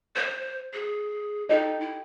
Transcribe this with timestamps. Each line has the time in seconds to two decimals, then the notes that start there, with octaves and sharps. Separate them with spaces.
0.16 C5
0.73 G#4
1.49 D#4 G4 A4 D#5
1.80 E4